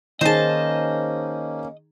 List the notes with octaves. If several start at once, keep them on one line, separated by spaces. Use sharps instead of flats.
D#3 A#3 C#4 D#4 G#4 C5 D#5 A5